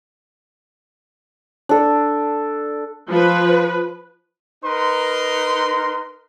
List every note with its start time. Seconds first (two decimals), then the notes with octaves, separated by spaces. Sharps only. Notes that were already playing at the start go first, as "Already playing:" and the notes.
1.69 D4 A4
3.09 F3 B4
4.65 D#4 A#4 B4 C6